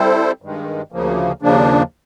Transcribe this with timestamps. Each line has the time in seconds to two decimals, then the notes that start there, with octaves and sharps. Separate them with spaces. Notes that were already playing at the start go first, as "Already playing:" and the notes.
Already playing: G3 C4 E4 A4 C5
0.42 G2 D#3 G#3
0.92 D2 C#3 F3 A#3
1.42 D#2 C#3 F3 A#3 D4